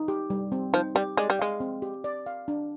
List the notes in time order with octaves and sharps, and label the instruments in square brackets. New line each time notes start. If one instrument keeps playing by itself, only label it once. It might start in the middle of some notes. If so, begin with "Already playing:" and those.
Already playing: [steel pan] D#4
G4
G3
C4
[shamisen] F3 [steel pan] D#4
[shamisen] G3 [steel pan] G4
[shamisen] G#3 [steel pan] D5
[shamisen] G3
[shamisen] G#3 [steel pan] F5
[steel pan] C4
G4
D5
F5
D4